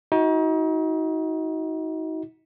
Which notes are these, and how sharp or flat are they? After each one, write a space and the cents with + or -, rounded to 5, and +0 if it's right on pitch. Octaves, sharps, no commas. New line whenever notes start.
D#4 +35 F#4 +0